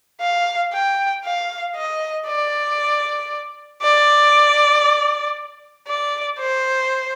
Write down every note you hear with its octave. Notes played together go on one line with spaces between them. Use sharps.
F5
G5
F5
D#5
D5
D5
D5
C5